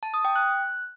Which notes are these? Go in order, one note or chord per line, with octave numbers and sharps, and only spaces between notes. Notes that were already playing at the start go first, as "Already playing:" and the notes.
A5
D#6
G5
F#6